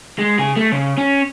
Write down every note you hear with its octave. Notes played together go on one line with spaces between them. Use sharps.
G#3
C#3 G#4
A3
C#3
C#4